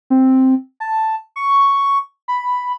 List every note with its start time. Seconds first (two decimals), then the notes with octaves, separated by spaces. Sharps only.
0.10 C4
0.80 A5
1.36 C#6
2.28 B5